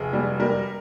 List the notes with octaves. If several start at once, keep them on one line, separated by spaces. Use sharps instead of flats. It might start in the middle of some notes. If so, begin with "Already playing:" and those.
Already playing: F1 G#4
G3
G3 A#4